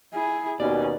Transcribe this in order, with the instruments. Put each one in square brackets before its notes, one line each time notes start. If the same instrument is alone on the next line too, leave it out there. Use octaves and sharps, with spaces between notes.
[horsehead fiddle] E4 G#4
[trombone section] D#2 B2 [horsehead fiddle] C#4 [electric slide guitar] D5